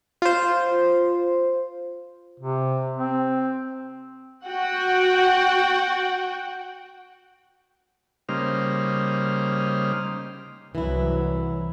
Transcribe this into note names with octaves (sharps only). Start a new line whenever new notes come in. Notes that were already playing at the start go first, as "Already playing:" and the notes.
F4 C5
C3
C4
F#4 F#5 G5
C#3 G3 A#3 D#4 C5 F6
C2 E3 F#3 E4